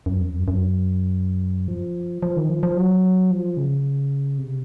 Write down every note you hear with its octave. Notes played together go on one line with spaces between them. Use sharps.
F#2
F2
F#2
F#2
F3
F3
D#3
F3
F3
F#3
F3
C#3
C3